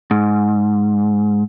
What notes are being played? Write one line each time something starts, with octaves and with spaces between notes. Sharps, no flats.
G#2